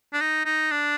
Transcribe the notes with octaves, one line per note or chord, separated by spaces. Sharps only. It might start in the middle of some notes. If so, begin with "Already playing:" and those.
D4
D#4
D#4
D4